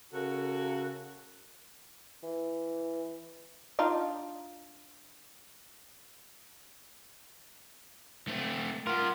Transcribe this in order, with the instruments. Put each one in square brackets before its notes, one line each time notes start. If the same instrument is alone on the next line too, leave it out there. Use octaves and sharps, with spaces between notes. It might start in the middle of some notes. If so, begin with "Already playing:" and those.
[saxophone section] C#3 F#4 A4 A#4
[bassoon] E3
[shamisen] D4 D#4 F4
[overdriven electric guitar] A3 C4
[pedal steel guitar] F4 [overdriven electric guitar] A#4 F#5